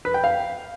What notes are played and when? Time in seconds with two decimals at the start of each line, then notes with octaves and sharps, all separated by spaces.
0.05 B4
0.14 G5
0.24 F5